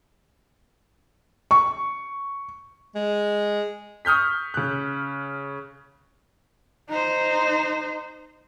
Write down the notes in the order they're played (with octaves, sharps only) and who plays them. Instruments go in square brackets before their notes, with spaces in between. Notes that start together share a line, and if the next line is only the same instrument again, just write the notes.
[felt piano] C#6
[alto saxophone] G#3
[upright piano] C#6 D#6 F6 G6 B6
C#3 F#6
[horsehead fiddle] D#4 C5